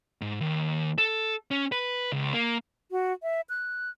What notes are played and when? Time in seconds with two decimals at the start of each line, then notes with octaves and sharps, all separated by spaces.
0.21 G#2
0.41 D#2
0.98 A4
1.51 C#4
1.72 B4
2.12 C#2
2.34 A#3
2.91 F#4
3.23 E5
3.49 F#6